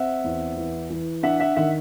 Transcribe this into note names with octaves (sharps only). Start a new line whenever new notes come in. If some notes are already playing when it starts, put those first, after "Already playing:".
Already playing: C4 E5 F#5
E2
E3
E3
D4 E5 F#5
E5 F#5
D#3 E5 F#5